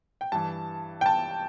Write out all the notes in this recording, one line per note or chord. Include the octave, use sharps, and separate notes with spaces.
G5
G2 E3 A5
G5
A5